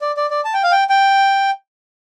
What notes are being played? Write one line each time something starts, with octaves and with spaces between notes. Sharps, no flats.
D5
D5
D5
A5
G5
F5
G5
G5